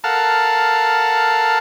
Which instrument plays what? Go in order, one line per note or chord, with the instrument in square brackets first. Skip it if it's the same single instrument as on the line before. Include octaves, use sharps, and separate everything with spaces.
[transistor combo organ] A4 A#4 F5 F#5 A5